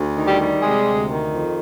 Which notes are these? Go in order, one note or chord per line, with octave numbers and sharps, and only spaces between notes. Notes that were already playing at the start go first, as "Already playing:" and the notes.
Already playing: D2
D#3
G3 G4
G3
C3 G#3 G#4
D2
D#3
F2